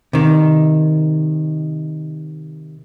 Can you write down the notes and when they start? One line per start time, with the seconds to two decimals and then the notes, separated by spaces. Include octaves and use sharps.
0.13 C3 D#3